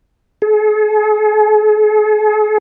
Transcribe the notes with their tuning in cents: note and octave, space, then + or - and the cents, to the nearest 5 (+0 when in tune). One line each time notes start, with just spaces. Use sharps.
G#4 +45